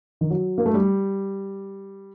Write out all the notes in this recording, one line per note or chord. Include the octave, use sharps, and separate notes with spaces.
D#3
F#3
A#3
A3
G3